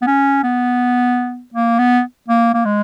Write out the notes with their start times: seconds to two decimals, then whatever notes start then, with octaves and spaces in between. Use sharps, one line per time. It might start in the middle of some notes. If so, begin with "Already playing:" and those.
0.02 B3
0.07 C#4
0.43 B3
1.54 A#3
1.79 B3
2.28 A#3
2.54 A#3
2.65 G#3